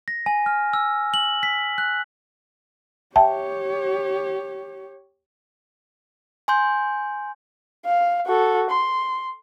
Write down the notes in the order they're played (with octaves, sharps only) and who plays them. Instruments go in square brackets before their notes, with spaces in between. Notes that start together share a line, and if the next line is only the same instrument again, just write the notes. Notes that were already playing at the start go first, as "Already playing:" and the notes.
[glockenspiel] A#6
G#5
F6
E6
F#7
B6
F#6
[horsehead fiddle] G4 C#5 [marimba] E5 G5 A5
[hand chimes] G#5 C6 G6
[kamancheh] F5
F#4 A4
C6